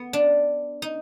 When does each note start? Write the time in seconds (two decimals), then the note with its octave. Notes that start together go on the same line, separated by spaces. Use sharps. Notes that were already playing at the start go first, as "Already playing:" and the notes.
Already playing: B3
0.13 D4
0.82 D#4